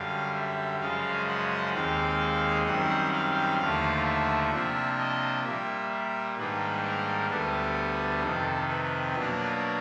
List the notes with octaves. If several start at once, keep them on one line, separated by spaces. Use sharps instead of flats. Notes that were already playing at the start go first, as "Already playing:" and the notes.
Already playing: F#2 D3 G3 F5
E5
F#2 C#3 F3 G#3 F5
F#5
D#2 D#3 G#3 C4 F5
F#2 D#3 G3 C4 F#5
F5
D#2 D3 F3 A3 F5
E5
C3 F3 A#3 D4
D#5
A#2 G3 A#3 E5
G#2 D#3 G3 A#3 D4 B4
A#4
D2 D3 G3 B3 D4 A4
F2 C3 D#3 A4
B4
B2 F#3 A#3 D4